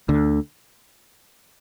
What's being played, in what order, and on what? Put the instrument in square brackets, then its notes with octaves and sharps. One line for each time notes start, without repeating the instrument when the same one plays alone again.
[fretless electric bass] D2 D3